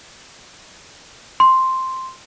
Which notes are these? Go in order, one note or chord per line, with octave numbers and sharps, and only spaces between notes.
C6